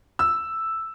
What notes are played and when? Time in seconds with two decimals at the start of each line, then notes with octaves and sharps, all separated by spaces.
0.19 E6